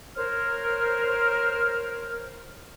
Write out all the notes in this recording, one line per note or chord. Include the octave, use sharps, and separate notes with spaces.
A#4 C5 C#5 F6